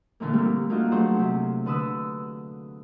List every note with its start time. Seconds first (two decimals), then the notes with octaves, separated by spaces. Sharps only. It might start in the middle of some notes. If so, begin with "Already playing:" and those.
0.20 A#2 D3 E3 A#3
0.33 G3 A3 A#3 C4
0.69 A3 A#3 D4 D#4 F4 F#4
0.92 F#3 A3 D4 G#4 C5
1.19 C3
1.66 D3 B4 D#6 E6